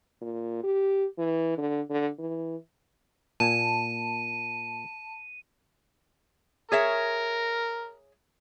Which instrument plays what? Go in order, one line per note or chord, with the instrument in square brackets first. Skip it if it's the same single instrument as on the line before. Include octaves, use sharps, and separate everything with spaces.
[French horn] A#2
G4
E3
D3
D3
E3
[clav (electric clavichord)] A#2 G#5 [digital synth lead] A5 [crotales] D#7
[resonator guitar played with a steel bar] G#4 C#5 E5 [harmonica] A#4